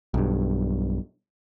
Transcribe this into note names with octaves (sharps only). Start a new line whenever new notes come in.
B1 G2